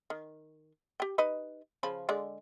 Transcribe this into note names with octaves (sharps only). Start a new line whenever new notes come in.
D#3
G4 G5
D#4 B4 D#5
C#3 F3 B5
D3 G#3 D5